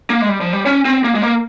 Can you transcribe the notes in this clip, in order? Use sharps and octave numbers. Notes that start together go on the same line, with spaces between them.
A#3
G#3
G3
F3
G3
C#4
C4
A#3
G#3
A#3